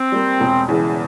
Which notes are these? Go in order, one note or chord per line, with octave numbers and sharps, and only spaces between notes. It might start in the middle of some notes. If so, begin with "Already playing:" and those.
Already playing: C4
G3 A#3
E1
E2 C#3 E3